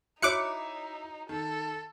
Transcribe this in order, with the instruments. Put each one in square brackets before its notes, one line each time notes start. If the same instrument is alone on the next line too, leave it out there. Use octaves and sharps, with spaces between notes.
[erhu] D#4 [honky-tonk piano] E4 [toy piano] F#4 C#5 [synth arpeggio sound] D6 F#6 C#7
[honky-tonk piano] D#3 [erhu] A4